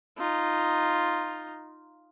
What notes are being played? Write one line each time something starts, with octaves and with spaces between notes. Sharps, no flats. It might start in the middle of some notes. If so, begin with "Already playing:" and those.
D#4 F4